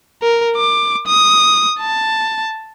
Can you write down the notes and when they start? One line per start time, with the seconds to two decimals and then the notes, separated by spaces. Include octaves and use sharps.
0.22 A#4
0.56 D6
1.07 D#6
1.80 A5